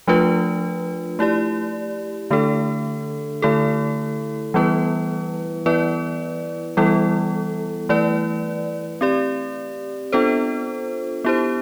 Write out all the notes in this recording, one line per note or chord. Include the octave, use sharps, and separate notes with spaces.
F3 A3 D4 F4 B4
A3 E4 G4 D5
D3 A3 D4 A4
D3 A3 E4 A4
E3 G3 B3 E4 B4
E3 B3 E4 B4 D5
E3 G3 B3 E4 A4
E3 A3 E4 B4 D5
C4 G4 D5
B3 D4 F4 A4 C5
B3 E4 G4 C5